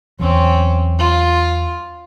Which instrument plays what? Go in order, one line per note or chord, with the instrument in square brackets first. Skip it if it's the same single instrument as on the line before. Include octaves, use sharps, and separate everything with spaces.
[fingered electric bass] E2 F#3 [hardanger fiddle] C4 C#4
[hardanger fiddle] F4